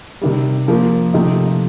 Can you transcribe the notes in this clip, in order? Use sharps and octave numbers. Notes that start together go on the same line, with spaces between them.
C3 D#3 G3
F3 A#3 F4
C3 F3 A3 D#4 G4